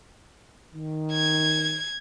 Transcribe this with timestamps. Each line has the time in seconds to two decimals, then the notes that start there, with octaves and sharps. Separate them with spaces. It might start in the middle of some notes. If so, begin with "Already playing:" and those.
0.75 D#3
1.12 G#6